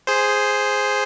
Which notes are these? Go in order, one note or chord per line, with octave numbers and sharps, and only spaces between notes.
G#4 C5